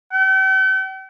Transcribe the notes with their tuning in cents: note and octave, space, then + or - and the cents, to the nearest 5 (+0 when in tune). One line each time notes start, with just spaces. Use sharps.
G5 -45